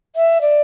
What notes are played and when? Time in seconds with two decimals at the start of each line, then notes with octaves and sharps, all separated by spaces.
0.16 E5
0.41 D5